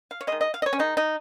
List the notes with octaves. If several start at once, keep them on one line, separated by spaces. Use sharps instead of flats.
F5
C#5
D#3 G#3 D#5
D#5
F5
D#5
C#5
C#4
D#3 G#3 D#4
D#4